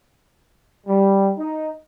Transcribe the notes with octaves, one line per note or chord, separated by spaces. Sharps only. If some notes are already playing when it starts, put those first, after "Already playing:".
G3
D#4